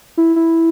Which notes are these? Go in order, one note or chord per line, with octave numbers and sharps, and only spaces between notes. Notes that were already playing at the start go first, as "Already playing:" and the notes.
E4
E4